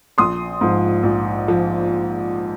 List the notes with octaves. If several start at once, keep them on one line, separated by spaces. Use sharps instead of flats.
A#1 C6 D#6
G#2 F3
A#1
F3